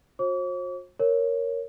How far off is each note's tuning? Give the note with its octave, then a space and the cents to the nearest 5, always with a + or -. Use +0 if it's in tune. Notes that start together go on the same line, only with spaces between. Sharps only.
F#4 -40 C5 +45 D6 -45
A#4 +0 C#5 +0